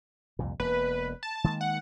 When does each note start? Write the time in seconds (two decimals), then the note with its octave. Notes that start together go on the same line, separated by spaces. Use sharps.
0.39 C2 F2 A#2
0.60 E1 A#3 B4
1.23 A5
1.44 D#3 G#3 A#3
1.61 F#5